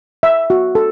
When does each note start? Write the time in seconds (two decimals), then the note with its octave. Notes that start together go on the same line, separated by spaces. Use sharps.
0.23 E5
0.50 F#4
0.75 A4